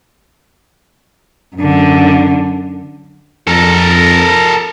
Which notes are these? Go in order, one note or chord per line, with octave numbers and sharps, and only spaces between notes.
F#2 D3
F2 A4 A#4